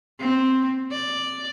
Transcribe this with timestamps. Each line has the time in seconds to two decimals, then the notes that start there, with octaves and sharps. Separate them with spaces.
0.19 C4
0.91 D5